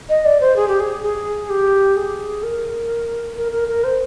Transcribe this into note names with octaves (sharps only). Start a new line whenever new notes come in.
D#5
D5
C5
G#4
G4
G#4
G#4
G4
G#4
A#4
A#4
A#4
A#4
C5